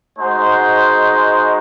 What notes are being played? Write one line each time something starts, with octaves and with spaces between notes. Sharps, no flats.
G#3 D#4 F#4 C5